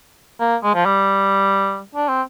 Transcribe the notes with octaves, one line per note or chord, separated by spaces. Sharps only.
A#3
G#3
F3
G3
D4
C4